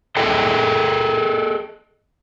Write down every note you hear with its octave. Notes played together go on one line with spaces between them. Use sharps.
G#4 A4 D#5 E5 G5